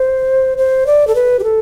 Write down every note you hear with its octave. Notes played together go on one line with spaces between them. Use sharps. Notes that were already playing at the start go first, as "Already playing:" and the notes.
Already playing: C5
C5
D5
A4
B4
G4
A4